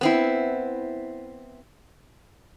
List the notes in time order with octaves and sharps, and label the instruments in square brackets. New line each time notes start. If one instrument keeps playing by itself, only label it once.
[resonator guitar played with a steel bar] B3 C4 E4